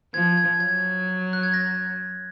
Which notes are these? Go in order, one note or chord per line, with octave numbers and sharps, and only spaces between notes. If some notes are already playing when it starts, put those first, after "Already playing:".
F3 G#6
G#6
F#3 G#6
F#6
G#6
A#6